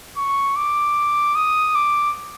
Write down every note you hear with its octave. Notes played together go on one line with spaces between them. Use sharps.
C#6
D6
D#6
D6